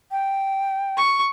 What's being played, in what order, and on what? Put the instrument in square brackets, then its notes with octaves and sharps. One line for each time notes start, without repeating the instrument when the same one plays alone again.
[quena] G5
[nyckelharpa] C#6